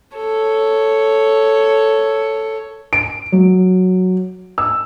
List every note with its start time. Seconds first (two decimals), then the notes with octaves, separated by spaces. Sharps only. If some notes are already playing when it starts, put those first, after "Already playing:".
0.15 A4 C#5
2.93 D7
3.32 F#3
4.58 E6